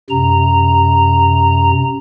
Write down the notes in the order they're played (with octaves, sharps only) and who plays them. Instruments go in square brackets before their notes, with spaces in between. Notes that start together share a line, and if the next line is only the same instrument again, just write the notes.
[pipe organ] F#2 C3 A#5